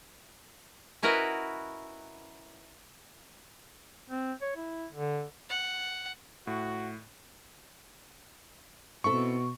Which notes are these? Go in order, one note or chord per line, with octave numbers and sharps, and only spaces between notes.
C#4 E4 F#4 A#4 B4 D#5
C4
C#5
E4
D3
F#5
A2 F#4
B2 C4 E4 A4 C#6